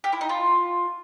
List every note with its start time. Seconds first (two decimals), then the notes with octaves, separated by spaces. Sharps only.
0.04 G4
0.12 E4
0.21 D#4
0.29 F4